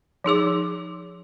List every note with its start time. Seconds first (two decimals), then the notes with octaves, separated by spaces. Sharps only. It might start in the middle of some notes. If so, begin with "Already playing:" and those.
0.24 F3 D#4 G#4 D6